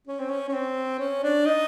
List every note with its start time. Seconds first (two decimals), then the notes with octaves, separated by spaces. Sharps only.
0.07 C#4
0.19 C4
0.30 C#4
0.48 C#4
0.53 C4
0.99 C#4
1.23 D4
1.45 D#4